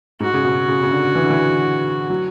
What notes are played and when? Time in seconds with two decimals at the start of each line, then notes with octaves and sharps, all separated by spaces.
0.20 G#2 F#4
0.34 C#3
0.45 B2
0.68 C#3
0.83 C#3
0.91 D3
1.15 E3
1.23 D3
1.30 E3
2.10 F#3